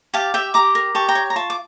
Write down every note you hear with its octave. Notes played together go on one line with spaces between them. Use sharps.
G4 F5 A5
G4 E5 G5
G4 A#5 D6
A#4
G4 A5 C#6
G5 A#5
C#5
A#5
F4 A5 C#6
D6